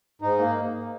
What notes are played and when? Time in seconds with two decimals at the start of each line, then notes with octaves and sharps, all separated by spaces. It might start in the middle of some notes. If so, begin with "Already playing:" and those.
0.22 G#2 D#4
0.39 A#3